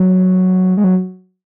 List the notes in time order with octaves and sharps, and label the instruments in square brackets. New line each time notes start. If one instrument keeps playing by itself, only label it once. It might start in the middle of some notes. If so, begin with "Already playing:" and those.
Already playing: [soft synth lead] F#3
G#3
F#3